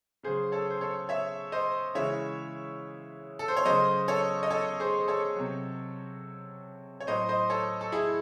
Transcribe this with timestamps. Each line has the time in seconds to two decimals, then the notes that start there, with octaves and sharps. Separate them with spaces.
0.23 C#3 F#3 G#4 C5
0.52 A4 C#5
0.70 C5
0.81 A4 C#5
1.09 C#5 E5
1.52 C5 D#5
1.95 C#3 E3 G#3 C#5 E5
3.39 A4
3.48 C5
3.57 C#5
3.65 C#3 F#3 C5 D#5
4.08 A4 C#5
4.43 D#5
4.50 A4 C#5
4.80 G#4 C5
5.08 A4 C#5
5.36 C3 F#3
7.00 C#5
7.07 A2 F#3 C5 D#5
7.29 C5 D#5
7.50 A4 C#5
7.81 A4
7.92 E4 G#4